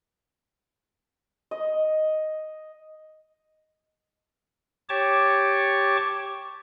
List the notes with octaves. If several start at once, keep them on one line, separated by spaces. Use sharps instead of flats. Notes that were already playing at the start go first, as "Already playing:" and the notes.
D#5
G4 C#5 A5 C#6 D6